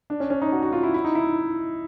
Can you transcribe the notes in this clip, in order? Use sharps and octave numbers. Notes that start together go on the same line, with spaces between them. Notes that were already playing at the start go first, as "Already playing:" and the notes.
D4
C#4
C#4
D#4
F#4
F#4
F4
E4
E4
D#4
E4